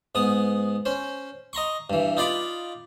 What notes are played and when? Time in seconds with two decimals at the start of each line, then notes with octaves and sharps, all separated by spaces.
0.15 G#2 B3 D#6
0.85 C#4 C5
1.53 D#5 A#5 C6 C#6
1.90 G2 E3
2.17 D#4 F4 D5 F5 B5 D6